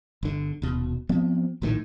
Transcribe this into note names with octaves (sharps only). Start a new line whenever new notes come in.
G1 D3
D#1 B2
F3 B3 C4
A#1 A2 D#3